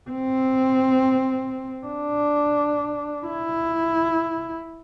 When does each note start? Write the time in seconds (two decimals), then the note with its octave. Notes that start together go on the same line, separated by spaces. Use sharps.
0.10 C4
1.86 D4
3.27 E4